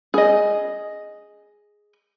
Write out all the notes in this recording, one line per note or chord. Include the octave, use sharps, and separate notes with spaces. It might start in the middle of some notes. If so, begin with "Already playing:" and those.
G#4 D#5